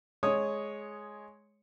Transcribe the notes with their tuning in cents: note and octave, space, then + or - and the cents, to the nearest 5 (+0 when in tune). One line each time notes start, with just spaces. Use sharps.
G#3 +10 C#5 +0 D#6 +0